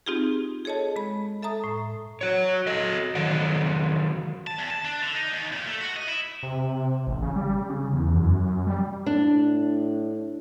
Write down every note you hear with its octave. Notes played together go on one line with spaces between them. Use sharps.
C4 D#4 F4 G4 G#4
G#4 A4 C#5 D#5 A5
G#3 B5
A4 E5 A5 A#5 D#6
A2
F#4 C#5
F#4 A4 D#5
D#3 F3 F#3 D5 F#5
A5
E2
A5
D4
D3
D#4
D#2
A#2
A3
F#4
D#5
E4
C3
A1
C#3
G3
C#3
E2
F#2
G3
A2 D4